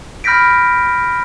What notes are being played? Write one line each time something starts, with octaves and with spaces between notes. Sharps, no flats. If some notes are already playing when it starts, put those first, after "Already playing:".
B5 F6 G6 A#6 B6 D7